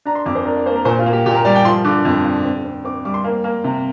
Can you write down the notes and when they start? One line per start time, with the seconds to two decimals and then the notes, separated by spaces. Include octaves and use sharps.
0.05 D4 A#5
0.15 C6
0.26 F2 D6
0.35 C5
0.45 D4 A#4
0.56 D5
0.66 A#3 C5
0.76 A#4
0.85 A#2 C5
0.99 F4
1.06 A#3
1.13 G4
1.26 A#2 G4
1.35 A#4
1.45 G3 D5
1.55 G5
1.65 F3 C6
1.85 D3 D6
2.05 F2
2.25 D3
2.45 C4
2.65 C4
2.84 C4 D6
3.05 G3 D6
3.14 C6
3.24 A#3
3.44 A#3
3.64 C3